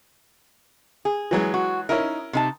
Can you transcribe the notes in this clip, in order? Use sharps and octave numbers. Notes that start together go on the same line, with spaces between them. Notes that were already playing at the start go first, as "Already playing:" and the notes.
G#4
E3 F#3 G#3
F#4
C#4 D#4 E4 A#4
C3 D#4 A5